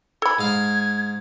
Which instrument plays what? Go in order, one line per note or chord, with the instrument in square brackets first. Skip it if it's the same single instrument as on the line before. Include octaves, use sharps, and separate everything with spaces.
[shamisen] A4 B5 [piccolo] G#6
[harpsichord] G#2 F5